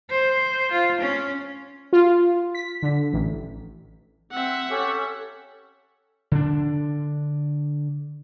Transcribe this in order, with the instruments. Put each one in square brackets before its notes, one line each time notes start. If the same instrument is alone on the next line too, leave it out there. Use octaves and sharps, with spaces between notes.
[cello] C5
F4
C#4
[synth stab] F4
B6
D3
A1
[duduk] C4 [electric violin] E5 F#5
[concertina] C#4 G4 [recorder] A4 [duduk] C#5
[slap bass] D3 D4